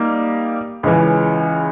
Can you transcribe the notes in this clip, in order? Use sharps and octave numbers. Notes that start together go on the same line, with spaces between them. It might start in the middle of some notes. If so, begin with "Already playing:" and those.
Already playing: G3 A#3 D#4
C#2 C#3 E3